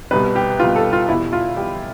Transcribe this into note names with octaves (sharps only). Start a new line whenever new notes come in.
C2 B2 G3 B4
G4
C2 B2 G3 F4
A4
F4
E2 B2 G3 E4
F4
E2 B2 G3 G4